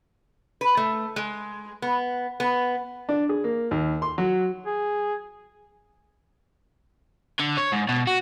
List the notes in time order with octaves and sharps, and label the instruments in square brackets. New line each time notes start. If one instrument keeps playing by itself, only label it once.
[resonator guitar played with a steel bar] B4
A3
G#3
B3
B3
[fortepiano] D4
G#4
A#3
D#2
C6
F#3
[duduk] G#4
[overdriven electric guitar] D3
C#5
G#2
B2
F#4